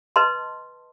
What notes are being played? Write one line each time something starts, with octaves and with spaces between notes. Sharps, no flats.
B4 D#5 A5 C6